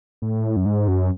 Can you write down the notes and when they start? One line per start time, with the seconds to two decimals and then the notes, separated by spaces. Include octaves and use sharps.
0.22 A2
0.56 F#2
0.66 G#2
0.88 F#2